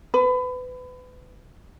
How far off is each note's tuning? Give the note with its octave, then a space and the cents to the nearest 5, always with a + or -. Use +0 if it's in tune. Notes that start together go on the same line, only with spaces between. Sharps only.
B4 +30